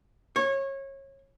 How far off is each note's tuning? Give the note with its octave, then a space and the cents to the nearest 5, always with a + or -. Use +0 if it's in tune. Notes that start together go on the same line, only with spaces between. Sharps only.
C#5 -25